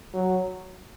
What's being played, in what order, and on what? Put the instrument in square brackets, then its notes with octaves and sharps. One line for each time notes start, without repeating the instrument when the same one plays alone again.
[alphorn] F#3